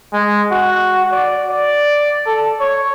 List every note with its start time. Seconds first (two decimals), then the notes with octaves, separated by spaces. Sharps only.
0.13 G#3
0.51 F#4
1.12 D5
1.50 D5
2.26 A4
2.60 C#5